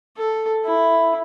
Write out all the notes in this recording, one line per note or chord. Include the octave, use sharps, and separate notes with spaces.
A4
E4